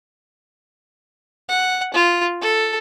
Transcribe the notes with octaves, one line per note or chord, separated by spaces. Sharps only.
F#5
F4
A4